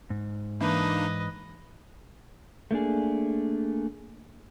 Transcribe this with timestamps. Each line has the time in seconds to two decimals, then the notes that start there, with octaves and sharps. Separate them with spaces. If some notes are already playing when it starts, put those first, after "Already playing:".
0.10 G#2
0.61 E3 A#3 D4 D#4 B4 D#5
2.71 A3 A#3 D4 G#4